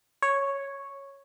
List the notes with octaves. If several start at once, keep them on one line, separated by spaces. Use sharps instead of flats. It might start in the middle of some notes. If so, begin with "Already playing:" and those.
C#5